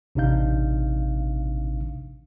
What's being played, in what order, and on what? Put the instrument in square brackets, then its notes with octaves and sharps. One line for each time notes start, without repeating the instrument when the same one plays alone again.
[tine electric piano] A1 C3 D4 D#4 F5 G6